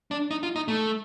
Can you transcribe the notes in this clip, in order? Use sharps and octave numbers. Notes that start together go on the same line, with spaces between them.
D4
D#4
F4
D#4
A3